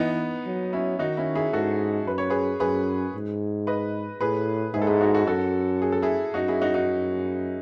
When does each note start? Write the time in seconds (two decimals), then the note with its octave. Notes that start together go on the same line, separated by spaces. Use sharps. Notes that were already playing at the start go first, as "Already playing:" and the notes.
Already playing: E3 B3 D#4
0.47 F#3
0.73 C#4 E4
0.99 D#3 D#4 F#4
1.17 C#4 E4
1.35 E4 G#4
1.53 G#2 F#4 A4
2.06 F#2 B4
2.18 C#5
2.30 G#4 B4
2.60 F#2 G#4 B4
3.14 G#2
3.67 B4 D#5
4.21 A2 G#4 B4
4.74 G#2 E4 G#4
4.82 A4
4.87 E4 G#4
5.01 D#4 F#4
5.14 F#4 A4
5.27 F#2 F#4 A4
5.82 G#4
5.92 A4
6.02 E4 G#4
6.34 F#2 D#4 F#4
6.48 E4 G#4
6.62 D#4 F#4
6.74 D#4 F#4